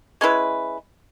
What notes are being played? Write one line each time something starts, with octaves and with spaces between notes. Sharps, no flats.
G#3 C#4 E4 B4